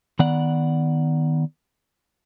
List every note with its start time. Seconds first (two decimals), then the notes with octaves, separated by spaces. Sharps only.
0.19 D#3 B3 D5 F#5